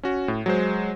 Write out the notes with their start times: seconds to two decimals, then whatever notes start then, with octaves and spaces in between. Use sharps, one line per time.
0.03 C#4 F#4
0.28 A2
0.46 F#3 G#3 C5